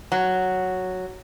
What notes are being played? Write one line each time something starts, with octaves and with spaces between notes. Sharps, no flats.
F#3